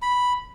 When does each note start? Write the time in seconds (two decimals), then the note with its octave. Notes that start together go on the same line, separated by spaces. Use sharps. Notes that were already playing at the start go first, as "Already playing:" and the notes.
0.02 B5